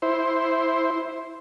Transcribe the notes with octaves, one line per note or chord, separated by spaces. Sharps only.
E4 C5